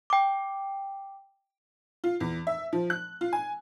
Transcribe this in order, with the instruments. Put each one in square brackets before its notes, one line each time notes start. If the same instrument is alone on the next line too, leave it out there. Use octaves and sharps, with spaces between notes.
[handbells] G5 D6
[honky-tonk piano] F4
E2
E5
F3
F#6
F4
G#5